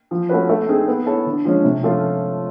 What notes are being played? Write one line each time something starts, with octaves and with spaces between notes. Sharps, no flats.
F3
A3 C#4 F#4 B4
A3
C4 D#4 G#4
B3
E4 A4 C#5
D3
F3 G#3 C#4
C3
F3 A3 C#4 F4